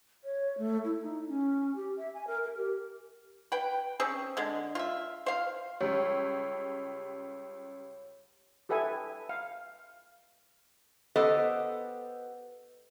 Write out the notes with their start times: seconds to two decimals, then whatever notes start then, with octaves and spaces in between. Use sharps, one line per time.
0.24 C#5
0.58 A3
0.85 E4
1.01 D#4
1.28 C#4
1.76 G4
1.97 E5
2.14 G#5
2.27 A#4
2.43 A#4
2.57 G4
3.52 B4 G5
4.00 C4 C#4 G#4
4.37 D3 G#3
4.75 F4 E5
5.26 C5 F5
5.81 C#2 G3 C#5
8.69 G4 A4 B4 E5 G#5
9.29 F5
11.16 B3 G4 A4 B4 C5 D#5